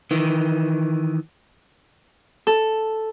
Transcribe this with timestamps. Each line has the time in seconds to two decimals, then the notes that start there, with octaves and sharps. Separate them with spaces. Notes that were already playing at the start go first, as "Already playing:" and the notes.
0.11 D#3 E3
2.47 A4